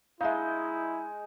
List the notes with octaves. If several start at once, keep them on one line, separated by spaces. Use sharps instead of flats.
G#3 D#4 E4 E5 F5